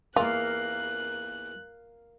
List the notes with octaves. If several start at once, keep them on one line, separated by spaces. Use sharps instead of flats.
E2 A#3 F4 A#4 F5 F#6